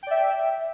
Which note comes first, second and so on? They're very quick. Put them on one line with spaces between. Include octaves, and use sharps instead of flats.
G5 D5 E5